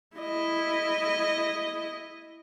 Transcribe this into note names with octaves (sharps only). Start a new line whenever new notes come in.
E4 D#5